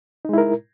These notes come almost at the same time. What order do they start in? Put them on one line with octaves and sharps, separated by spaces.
D#4 G#3 E4 A#4